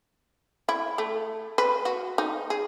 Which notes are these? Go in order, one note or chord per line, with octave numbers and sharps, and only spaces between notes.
E4
A3
B4
F#4
D#4
G#4